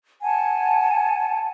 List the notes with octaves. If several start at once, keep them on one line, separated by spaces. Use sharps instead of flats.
F#5 G#5 A5